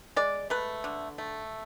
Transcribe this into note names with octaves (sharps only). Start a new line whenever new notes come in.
G#3 D5
A3 B4
D3
A3